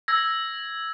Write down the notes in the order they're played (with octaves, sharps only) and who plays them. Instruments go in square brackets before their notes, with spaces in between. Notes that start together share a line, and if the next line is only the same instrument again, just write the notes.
[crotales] E6 G#6 A#6